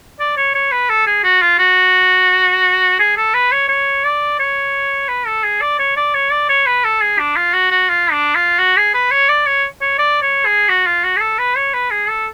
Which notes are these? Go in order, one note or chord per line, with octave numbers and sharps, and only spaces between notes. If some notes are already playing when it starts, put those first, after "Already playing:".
D5
C#5
C#5
B4
A4
G#4
F#4
F4
F#4
G#4
A4
B4
C#5
C#5
D5
C#5
B4
A4
G#4
D5
C#5
D5
C#5
D5
C#5
B4
A4
G#4
D4
F4
F#4
F#4
F4
D4
F4
F#4
G#4
B4
C#5
D5
C#5
C#5
D5
C#5
G#4
F#4
F4
F#4
G#4
A4
B4
C#5
B4
G#4
A4